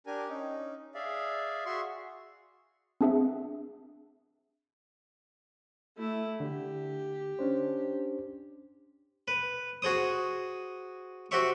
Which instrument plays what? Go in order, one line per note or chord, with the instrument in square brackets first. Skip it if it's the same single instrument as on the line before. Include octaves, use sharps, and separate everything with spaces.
[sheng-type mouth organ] D4 G4 A#4 G#5
C#4 D#4
G#4 D5 E5 F5
F#4 G#4 E5 C6 C#6
[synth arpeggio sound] C4 D4 G#4 E5 F#5
[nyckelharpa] A3 E4
[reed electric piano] D3 [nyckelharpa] G4
[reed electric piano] C#4 D4 C5
[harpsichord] B4
F#4 G#4 C5 D#6
F#4 G4 C5 E5 C#6